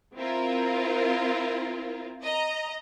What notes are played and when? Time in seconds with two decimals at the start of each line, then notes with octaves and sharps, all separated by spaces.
0.16 C4 E4 F4 A#4
2.23 D#5 A#5